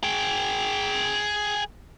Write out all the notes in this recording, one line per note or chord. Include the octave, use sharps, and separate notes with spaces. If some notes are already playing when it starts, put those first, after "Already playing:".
G#4 G5